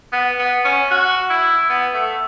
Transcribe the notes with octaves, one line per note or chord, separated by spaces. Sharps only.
B3
B3
C#4
F#4
E4
B3
A3